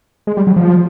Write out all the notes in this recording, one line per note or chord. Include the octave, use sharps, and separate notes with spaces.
G#3
G3
F#3
F3